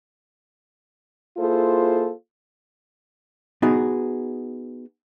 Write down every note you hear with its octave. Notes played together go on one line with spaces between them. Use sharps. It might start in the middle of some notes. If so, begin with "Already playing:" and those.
A#3 E4 F4 G#4 A4 C5
B3 D#4 F#4 G#4